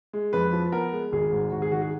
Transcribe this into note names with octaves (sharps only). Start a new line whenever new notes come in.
G#3
F2 B4
F3
B3 A#4
G#3
G#1 G#4
G#2
G#1 F#4
G#4
D#3 F#4
G#4